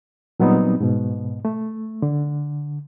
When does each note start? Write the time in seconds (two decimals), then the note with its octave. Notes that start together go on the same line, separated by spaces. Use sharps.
0.40 A#2 F#3 G3 B3 C4 D#4
0.80 G#2 B2
1.45 A3
2.02 D3